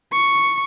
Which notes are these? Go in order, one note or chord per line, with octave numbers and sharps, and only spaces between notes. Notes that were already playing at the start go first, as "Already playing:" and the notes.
C#6